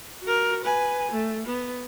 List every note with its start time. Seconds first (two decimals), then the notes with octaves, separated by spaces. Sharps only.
0.23 F#4 A#4
0.64 B4 G#5
1.11 A3
1.47 B3